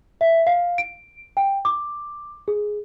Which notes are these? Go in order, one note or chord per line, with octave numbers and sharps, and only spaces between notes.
E5
F5
D7
G5
D6
G#4